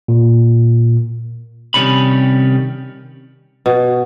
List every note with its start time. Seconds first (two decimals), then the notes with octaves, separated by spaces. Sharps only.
0.08 A#2
1.74 C3 D#3 G3 C#4 B5
3.66 B2